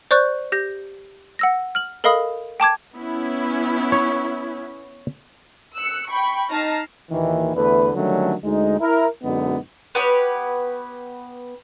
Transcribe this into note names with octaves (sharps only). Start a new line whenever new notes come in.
C5 D5 C#6 F#6 G6
G4 G6 A#6
F#5 E6 A#6
F6 F#7
A4 A#4 D#5 F5 B5 D#6
G5 A5 D6 G#6
B3 C#4 E4
C#5
E6 F#6 C#7
G5 B5 C#6
D#4 A5 F6 A#6 C7
D#2 A#2 D#3 E3
E2 D3 A3 B4
D3 D#3 F#3 G3 A3 C#4
D2 G#3 D#4
E4 A#4
F#2 B2 D3 G#3 B3 D#4
B3 G4 B4 C#5